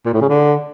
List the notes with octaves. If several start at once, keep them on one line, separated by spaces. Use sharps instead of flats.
A#2
A2
C#3
D3